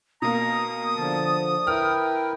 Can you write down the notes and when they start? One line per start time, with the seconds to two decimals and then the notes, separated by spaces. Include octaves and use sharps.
0.22 B2 A#3 A#5 D#6
0.97 D3 F3 A5
1.67 E4 A#4 B4 G5 F6